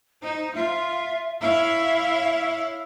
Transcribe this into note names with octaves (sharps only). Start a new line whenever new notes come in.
D#4 C5
F4 E5
E4 C#5 E5 F5